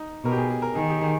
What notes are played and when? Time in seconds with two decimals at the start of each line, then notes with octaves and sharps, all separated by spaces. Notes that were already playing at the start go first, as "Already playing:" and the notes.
Already playing: D#4
0.24 B2 A#4
0.32 G4
0.38 G#4
0.50 G#4
0.62 A#4
0.75 D#3 G#4
0.90 G4
1.01 G#4